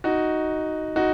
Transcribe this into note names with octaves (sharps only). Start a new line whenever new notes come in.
D#4 F#4
D#4 F#4